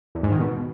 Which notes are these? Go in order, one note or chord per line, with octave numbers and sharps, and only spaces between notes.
E2
G#2
D#3
B2